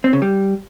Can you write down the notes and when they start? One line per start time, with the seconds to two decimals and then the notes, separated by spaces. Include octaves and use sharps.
0.04 C4
0.13 C#3
0.22 G3